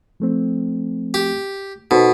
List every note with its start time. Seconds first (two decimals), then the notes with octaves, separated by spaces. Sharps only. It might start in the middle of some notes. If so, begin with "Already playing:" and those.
0.20 F3 A3 C4
1.14 G4
1.91 B2 D#4 A4 C5